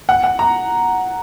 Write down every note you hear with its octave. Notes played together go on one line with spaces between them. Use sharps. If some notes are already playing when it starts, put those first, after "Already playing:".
F#5
F#5
A#5